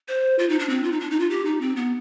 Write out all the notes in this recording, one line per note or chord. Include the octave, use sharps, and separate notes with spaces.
C5
F4
D#4
D4
C4
F4
D#4
D4
D#4
F4
G4
D#4
C4
B3